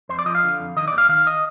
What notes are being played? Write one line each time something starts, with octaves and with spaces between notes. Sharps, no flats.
F2 C5
D5
F3 D#5
F5
D3
F2
D#3 D#5
D5
D#2
F5
D#3 F5
D#5